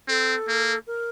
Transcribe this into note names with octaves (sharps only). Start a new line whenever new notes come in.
C4 A4
A#3
A#4